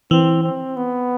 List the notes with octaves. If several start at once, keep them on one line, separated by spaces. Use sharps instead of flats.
E3 C4
C4
B3